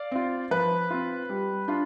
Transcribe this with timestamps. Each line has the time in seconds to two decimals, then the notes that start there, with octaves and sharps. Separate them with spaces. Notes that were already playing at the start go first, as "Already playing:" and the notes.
Already playing: D5 F5
0.12 C4 F4
0.51 F3 B4
0.90 C4 F4
1.30 G3
1.68 D4 F4